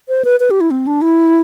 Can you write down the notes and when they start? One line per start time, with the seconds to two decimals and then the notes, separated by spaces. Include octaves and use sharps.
0.09 C5
0.25 B4
0.40 B4
0.51 G4
0.61 E4
0.71 C4
0.87 D4
1.02 E4